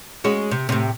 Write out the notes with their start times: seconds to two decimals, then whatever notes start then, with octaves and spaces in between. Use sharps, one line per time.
0.24 G#3 C#4 F#4
0.51 C3
0.69 A2 C3